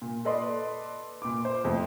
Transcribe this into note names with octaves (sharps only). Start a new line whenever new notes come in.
A#2
A4 B4 D5 D#5 C6
A#2 D6
C5
F2 A2